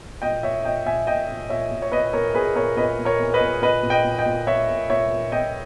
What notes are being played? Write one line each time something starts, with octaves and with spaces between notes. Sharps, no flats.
A#2 D#5 G5
A#2 C#5 E5
A#2 D#5 G5
A#2 E5 G#5
A#2 D#5 G5
A#2
A#2 C#5 E5
A#2
C#5
A#2 B4 D#5
A#2 A#4 C#5
A#2 G#4 B4
A#2 A#4 C#5
A#2 B4 D#5
A#2
A#4 C#5
A#2
B4 D#5
A#2
A#2 B4 D#5
A#2
D#5 G5
A#2
D#5 G5
A#2
A#2 C#5 E5
A#2
A#2 C#5 E5
A#2
A#2 D#5 G5